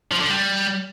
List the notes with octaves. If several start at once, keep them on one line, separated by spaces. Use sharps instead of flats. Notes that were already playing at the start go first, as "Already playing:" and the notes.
F3
D3
G3